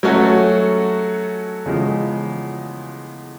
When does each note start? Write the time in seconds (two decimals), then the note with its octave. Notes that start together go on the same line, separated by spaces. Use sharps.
0.03 F#3 A3 C#4 F#4 A4
1.65 E2 C#3 F3 G#3